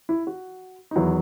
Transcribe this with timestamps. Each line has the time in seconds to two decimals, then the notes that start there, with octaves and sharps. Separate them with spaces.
0.09 E4
0.27 F#4
0.91 D#4
0.96 E2 D#3 F#3 B3 E4